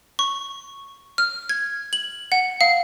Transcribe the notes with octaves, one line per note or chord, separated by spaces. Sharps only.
C#6
F6
G#6
F#7
F#5
F5